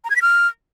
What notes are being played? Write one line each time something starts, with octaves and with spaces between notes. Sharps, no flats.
A#5
G#6
B6
F6